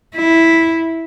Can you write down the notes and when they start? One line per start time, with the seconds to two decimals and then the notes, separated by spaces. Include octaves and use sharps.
0.16 E4